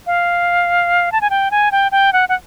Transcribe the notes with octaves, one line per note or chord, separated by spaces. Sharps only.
F5
A5
G#5
G5
G#5
G5
G5
F#5
F#5